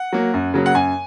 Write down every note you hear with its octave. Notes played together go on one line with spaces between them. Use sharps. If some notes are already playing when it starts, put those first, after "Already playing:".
Already playing: F#5
F#3 A#3
F#2
C#3 F#3 A#3
F#5
F#2 G#5